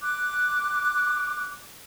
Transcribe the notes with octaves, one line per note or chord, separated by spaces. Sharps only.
D6 F#6